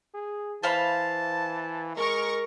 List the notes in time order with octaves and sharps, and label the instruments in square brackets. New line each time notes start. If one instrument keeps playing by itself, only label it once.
[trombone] G#4
[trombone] E3 [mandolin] C5 F5 B5 [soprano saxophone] A5
[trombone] G#3 [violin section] A#4 C#6